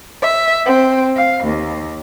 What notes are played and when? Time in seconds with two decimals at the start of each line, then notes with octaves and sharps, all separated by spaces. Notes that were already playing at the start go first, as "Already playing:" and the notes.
0.21 E5
0.66 C4
1.15 F5
1.44 D#2